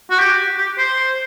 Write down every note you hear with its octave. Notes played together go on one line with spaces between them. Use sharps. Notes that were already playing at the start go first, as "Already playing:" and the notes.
F#4
G4
G4
C5